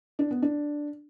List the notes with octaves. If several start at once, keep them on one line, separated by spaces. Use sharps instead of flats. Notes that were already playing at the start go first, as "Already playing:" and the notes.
D4
B3
D4